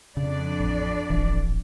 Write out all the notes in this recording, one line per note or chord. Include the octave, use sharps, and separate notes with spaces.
F2 C#3 D4 D5
A1
D1 G#1 E3